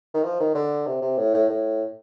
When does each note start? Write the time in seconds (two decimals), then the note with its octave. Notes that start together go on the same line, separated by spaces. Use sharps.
0.14 D#3
0.23 F3
0.40 D#3
0.55 D3
0.86 C3
1.02 C3
1.18 A2
1.34 A2
1.50 A2